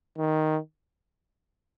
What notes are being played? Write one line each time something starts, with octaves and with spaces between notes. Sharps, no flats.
D#3